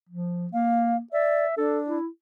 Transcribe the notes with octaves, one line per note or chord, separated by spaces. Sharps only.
F3
A#3 F5
D5 E5
D4 A4
E4